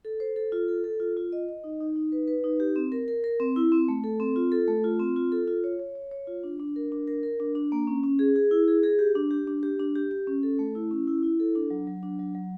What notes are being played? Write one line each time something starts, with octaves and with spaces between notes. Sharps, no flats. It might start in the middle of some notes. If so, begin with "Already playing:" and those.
A4
C5
A4
F4
A4
A4
F4
F4
D#5
D#5
D#4
D#4
D#4
B4
B4
D#4
G4
C4
A#4
A#4
A#4
C4
E4
C4
A3
A4
C4
F4
A4
A3
F4
C4
F4
A4
F4
C#5
C#5
C#5
C#5
F4
D4
D4
A#4
D4
A#4
A#4
D4
D4
A#3
C#4
C#4
G#4
G#4
E4
G#4
G#4
G4
D4
G4
D4
G4
D4
G4
G4
C#4
A4
A3
E4
C#4
E4
E4
A4
D4
F#3
F#3
D4
F#3
F#3